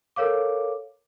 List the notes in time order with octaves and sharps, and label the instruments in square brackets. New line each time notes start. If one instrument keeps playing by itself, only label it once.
[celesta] A4 A#4 C#5 F5 D6